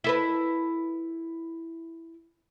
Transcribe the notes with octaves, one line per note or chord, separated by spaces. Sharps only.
E4 A4 B4